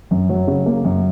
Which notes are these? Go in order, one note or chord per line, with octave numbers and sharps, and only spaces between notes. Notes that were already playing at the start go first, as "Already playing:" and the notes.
F#2
F#3
C#3
A#3
F#2